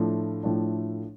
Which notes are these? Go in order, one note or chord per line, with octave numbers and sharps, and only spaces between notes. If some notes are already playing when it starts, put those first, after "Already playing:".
Already playing: A2 F3 A3 D4 F4
A2 F3 A3 D4